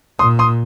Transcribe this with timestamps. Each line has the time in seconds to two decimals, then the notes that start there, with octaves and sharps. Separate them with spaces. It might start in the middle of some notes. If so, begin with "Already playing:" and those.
0.19 A#2 C6 D#6
0.39 C6 D#6